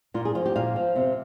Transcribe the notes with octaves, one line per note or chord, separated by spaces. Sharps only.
A#2 F4
G#4
F3 F4
G4
A#2 F5
F3
C3